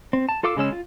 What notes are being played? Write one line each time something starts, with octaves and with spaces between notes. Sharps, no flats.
C4
A5
F4 A4 F5 D6 E6
C#3 G#3 C#4 E6
F4